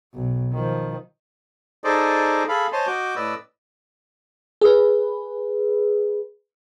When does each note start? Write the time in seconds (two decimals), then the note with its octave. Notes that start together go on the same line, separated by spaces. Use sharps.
0.14 B1
0.53 D#3 F3
1.83 D#4 G#4 A4 C5 D5 D#5
2.49 G#4 A4 F5 B5
2.72 C5 C#5 D#5 G#5 A5 C6
2.87 F#4 D#5 D6 G6
3.16 A2 B4 D5 D#5 E6
4.61 G#4 B4